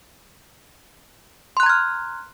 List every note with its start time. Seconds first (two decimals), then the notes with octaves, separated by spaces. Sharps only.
1.57 C6
1.60 F#6
1.63 A#5
1.66 G#6
1.69 F6